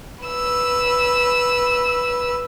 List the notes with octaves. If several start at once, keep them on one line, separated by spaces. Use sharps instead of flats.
B4 E6